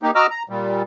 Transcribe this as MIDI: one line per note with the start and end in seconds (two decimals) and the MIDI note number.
0.03 0.11 58
0.03 0.11 63
0.03 0.11 67
0.15 0.27 66
0.15 0.27 75
0.15 0.27 82
0.15 0.27 86
0.15 0.27 88
0.15 0.27 89
0.30 0.43 82
0.49 0.82 46
0.49 0.82 55